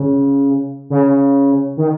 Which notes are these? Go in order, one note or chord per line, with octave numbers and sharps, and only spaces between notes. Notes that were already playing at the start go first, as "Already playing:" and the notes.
Already playing: C#3
C#3
D#3